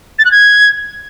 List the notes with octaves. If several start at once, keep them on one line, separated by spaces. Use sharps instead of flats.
A6
F#6
G#6